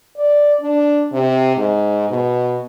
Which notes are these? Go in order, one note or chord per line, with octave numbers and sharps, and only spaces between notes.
D5
D4
C3
G#2
B2